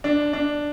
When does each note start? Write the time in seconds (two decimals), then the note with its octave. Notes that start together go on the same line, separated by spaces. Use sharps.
0.04 D4
0.33 D4